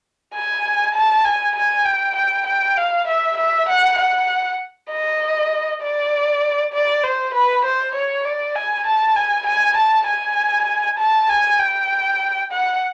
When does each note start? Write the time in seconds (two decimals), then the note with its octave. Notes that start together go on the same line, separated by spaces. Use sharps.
0.34 G#5
0.95 A5
1.25 G#5
1.56 G#5
1.85 G5
2.16 G5
2.47 G5
2.77 F5
3.08 E5
3.38 E5
3.69 F#5
3.98 F#5
4.91 D#5
5.82 D5
6.73 D5
7.04 C5
7.35 B4
7.65 C5
7.95 C#5
8.25 D5
8.56 G#5
8.87 A5
9.16 G#5
9.47 G#5
9.77 A5
10.08 G#5
10.99 A5
11.30 G#5
11.60 G5
12.52 F#5